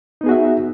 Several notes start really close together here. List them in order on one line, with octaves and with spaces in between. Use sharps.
D#4 B3 G#4 F#4 E5